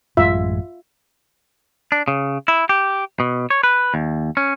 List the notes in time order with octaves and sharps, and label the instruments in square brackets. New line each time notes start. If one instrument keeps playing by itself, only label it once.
[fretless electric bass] A1 F#2 G#3 [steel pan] F4 E5
[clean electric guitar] D4
C#3
E4
G4
B2
C#5
B4
D#2
C#4